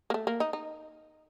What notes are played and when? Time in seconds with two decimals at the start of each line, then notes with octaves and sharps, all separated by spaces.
0.10 A#3
0.14 A3
0.27 A#3
0.40 D#4
0.53 D#4